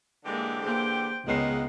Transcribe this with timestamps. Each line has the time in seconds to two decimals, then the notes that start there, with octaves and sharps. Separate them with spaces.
0.25 D3 E3 G#3 A#3 G4
0.63 A#3 G#4 C5 G5
1.28 C#2 D#3 G#3 B3 C#5 F#5 C7